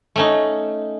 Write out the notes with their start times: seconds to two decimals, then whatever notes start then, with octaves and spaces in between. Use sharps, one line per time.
0.16 A3 C#4 D#4